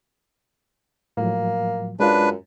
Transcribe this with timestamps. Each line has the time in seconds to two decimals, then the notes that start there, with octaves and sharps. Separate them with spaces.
1.17 A2 F3 F#3 A#3
2.00 F#2 G#3 D4 F4 B4